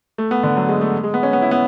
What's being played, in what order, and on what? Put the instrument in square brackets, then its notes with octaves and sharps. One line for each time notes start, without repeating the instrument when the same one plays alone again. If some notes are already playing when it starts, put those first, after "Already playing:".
[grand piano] A3
B3
D3
F#3
G#3
A3
G#3
B3
C#4
B3
E4
B3